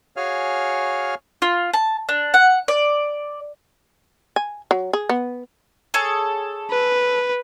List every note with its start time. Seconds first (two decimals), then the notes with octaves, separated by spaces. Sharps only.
0.17 F#4 G#4 C#5 F5 G#5 F6
1.42 F4
1.73 A5
2.09 D4
2.34 F#5
2.68 D5
4.36 G#5
4.71 F#3
4.93 G#4
5.09 B3
5.94 G#4 A4 C#5
6.70 B4